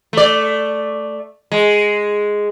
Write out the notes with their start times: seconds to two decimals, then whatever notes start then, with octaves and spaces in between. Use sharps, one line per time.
0.13 A3 D5
1.52 G#3